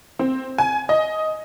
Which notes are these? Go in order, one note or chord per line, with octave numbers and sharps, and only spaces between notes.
C4
G#5
D#5